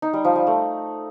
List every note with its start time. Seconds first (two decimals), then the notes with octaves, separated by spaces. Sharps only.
0.02 D#4
0.13 G3
0.25 F3
0.36 G3
0.47 A3